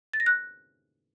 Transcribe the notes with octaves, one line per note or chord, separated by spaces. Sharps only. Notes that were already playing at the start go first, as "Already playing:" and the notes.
A6
A#6
F#6